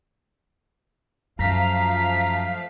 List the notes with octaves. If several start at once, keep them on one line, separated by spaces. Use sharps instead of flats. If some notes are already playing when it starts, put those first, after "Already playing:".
F#2 F3 A3 F5 A#5 B6